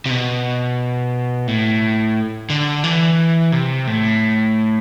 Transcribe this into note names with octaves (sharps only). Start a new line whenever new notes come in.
C3
B2
A2
D3
E3
C3
A2